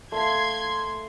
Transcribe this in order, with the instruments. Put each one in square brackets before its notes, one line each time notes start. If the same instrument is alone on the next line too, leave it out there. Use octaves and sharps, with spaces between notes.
[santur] A3 F5 [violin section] C6 G#6